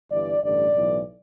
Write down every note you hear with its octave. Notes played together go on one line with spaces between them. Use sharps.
G1 G2 E3 D5
A1 G2 D3 D5
B1 A2 E3